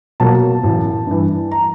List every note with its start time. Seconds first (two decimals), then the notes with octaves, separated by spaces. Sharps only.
0.20 B2 F#3 A#3 A5
0.64 A1
1.07 G2 E3
1.52 A#5